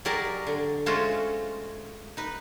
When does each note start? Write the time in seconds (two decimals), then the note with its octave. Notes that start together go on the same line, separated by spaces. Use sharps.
0.05 F#3 G4 G#4 A#4 D5 D#5
0.47 D3
0.86 G#3 A3 C#4 F4 F#4 C5
2.17 D#4 B4